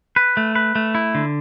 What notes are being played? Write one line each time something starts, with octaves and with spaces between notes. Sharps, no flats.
B4
A3
B4
A3
E4
D3